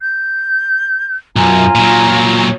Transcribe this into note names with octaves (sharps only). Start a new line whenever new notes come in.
G6
B1 F#2 F4 G#5 A#5
A#2 F#3